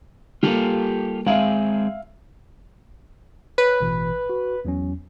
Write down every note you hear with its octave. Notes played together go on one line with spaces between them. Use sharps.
G3 A#3 F4 G4 A4
G#3 C4 G#4 E5 F5
B4 C#5
A1 B2 E3
F#4
E2 F#3 C#4